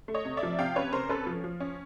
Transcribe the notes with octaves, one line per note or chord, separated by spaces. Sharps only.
A3
C#5 D#5
C3
D5 E5
F3
C3 F5 G5
C#4 B4 C#5
C3 A#4 C5
C#4 A4 B4
F3
F3
C#4